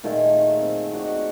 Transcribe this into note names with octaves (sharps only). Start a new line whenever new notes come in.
A#2 D#3 A3 G#4
C4
F#4 D5 D#5